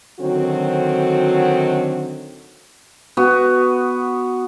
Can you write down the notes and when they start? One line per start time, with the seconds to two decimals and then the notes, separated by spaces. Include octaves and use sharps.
0.20 D3 D#3 F#3 C4 F#4
3.17 B3 F#4